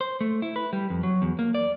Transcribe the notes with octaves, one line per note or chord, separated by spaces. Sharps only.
C5
A3
E4
B4
G3
F2
F#3
E2
A#3
D5